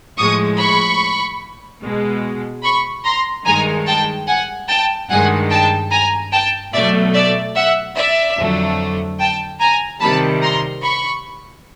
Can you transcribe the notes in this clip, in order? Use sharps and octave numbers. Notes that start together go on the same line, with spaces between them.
A2 F3 G#3 C#6 D#6
B5 C#6
B2 G#3
B5 C#6
A#5 C6
G2 D#3 G#3 G#5 A#5
G5 A5
F#5 G#5
G5 A5
G2 D#3 G#3 F#5 G#5
G5 A5
G#5 A#5
G5 A5
B2 F#3 A3 D5 E5
D5 E5
E5 F#5
D5 E5
F2 D3 F#3 A3
G5 A5
G#5 A#5
C3 D#3 G3 A5 B5
A#5 C6
B5 C#6